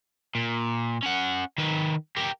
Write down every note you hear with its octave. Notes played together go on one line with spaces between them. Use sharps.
A#2
C#4 F#5
D#3 B4
G4 A#4